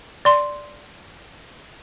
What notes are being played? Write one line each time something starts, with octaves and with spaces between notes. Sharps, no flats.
D5 C6